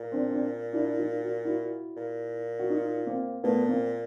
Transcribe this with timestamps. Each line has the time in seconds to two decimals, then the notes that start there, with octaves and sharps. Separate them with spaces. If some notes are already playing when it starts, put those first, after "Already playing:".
Already playing: A#2
0.12 C4 D4
0.31 C4 D4
0.73 D4 E4
0.98 D#4 F4
1.23 F#4
1.45 E4 F#4
1.97 A#2
2.59 F#4
2.70 D#4 F4
3.07 A#3 C4
3.44 A#2 A3 B3
3.68 A#3 C4